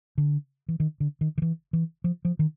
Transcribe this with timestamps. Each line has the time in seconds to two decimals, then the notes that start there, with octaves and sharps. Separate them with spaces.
0.18 D3
0.68 E3
0.80 D#3
1.00 D3
1.21 D#3
1.38 D#3
1.42 E3
1.73 E3
2.04 F3
2.25 F3
2.39 D#3